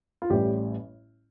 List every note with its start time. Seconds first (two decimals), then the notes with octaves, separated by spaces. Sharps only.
0.22 F4
0.30 A1 A2 G3 G4